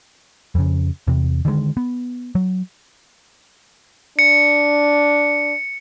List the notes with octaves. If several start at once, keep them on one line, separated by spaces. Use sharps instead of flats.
F2 C#3
E2 C3
D3 D#3 F3 G#3
B3
F#3
D4 C#7